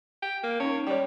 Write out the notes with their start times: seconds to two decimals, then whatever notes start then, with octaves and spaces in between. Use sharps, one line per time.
0.22 G5
0.43 A#3
0.60 C#4 D#4 C#5
0.87 G3 C#5 G5